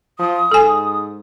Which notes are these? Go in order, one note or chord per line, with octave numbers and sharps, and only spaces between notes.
F3 D#6
G#2 A4 G#5